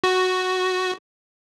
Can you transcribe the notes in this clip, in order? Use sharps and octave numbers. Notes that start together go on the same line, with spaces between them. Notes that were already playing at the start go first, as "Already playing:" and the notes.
F#4